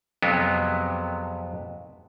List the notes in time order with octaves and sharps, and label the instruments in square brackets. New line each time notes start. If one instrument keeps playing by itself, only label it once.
[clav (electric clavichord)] F2 C3 F#3 G#3 B3